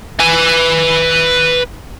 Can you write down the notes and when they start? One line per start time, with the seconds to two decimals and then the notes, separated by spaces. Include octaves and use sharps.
0.20 B4 G#5